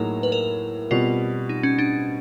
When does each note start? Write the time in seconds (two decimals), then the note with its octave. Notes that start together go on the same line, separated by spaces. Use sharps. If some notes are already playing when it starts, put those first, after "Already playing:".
Already playing: A2 F#3 A#3 D#4 G#4 A#4
0.23 B4
0.32 A#4
0.91 B2 G3 C4 F4
1.49 D#4
1.63 C#4
1.79 D4